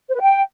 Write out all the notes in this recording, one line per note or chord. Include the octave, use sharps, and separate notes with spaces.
C5
B4
G5